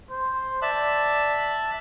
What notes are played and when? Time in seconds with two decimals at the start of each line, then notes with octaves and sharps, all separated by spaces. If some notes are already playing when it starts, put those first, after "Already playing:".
0.10 C5
0.62 D5 E5 A5 F#6